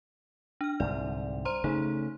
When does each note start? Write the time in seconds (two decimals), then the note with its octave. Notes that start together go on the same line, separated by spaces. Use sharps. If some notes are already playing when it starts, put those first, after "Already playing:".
0.61 D4 F6
0.80 C2 G#2 D3 D5
1.45 C5 A#5 C6
1.64 C#3 A3 D#4 G#4